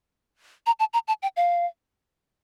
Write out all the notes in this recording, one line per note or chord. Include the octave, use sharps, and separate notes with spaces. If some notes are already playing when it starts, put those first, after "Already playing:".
A#5
A5
A#5
A5
G5
F5